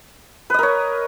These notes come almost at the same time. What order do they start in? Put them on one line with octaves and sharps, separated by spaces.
B4 D#5 A#4 C#5